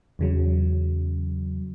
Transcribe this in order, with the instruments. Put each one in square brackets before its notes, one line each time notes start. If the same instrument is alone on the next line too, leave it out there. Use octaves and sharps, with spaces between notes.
[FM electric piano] E2 C#3 F#3